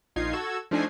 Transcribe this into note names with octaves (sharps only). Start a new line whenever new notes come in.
A#1 D#4 F4 G#6 C7
F#4 A4 E6 G#6
F3 A3 D4 D#4 G#5 C7